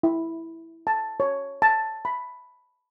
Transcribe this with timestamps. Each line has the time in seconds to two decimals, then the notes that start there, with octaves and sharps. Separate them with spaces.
0.03 E4
0.87 A5
1.20 C#5
1.62 A5
2.05 B5